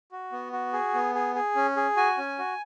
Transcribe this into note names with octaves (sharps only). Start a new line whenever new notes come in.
F#4
B3
F#4
G#4
B3
G#4
G#4
C#4
G#4
F#4 G#5
C#4
F#4